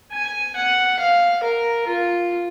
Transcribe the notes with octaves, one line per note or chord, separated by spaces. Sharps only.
G#5
F#5
F5
A#4
F4